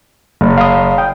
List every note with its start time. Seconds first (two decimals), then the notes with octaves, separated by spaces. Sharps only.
0.41 F#1
0.57 F5 D#6
0.98 G5